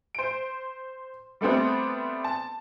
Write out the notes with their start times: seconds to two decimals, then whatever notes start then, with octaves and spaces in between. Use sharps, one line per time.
0.15 C5 D7
1.41 G3 A3 B3 C4 D4
2.24 A5